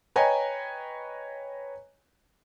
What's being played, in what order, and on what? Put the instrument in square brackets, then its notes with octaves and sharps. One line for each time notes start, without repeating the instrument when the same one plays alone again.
[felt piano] B4 C#5 D#5 G5 G#5 A#5